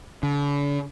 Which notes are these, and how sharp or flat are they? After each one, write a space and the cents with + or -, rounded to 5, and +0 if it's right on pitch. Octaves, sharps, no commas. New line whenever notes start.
D3 -45